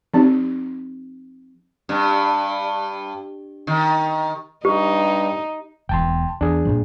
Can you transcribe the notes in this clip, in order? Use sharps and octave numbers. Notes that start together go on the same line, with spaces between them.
F3 C4 D#4 G4
G2
D#3
G2 D#4 G4
E1 E2 G5 A5 C6
E2 D4 G#4
G2 A#2 F3